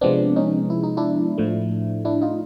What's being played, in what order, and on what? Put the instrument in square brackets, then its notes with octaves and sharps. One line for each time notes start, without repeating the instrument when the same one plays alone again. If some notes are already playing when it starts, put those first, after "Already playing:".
[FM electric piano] C3 F3 G#3 B3 C4 D4
C#4 D#4
E4
D#4
D4 E4
A2 F3 A3
D4 E4
D#4 F4